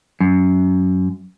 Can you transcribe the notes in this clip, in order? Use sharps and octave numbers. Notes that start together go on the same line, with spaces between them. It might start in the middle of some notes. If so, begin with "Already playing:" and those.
F#2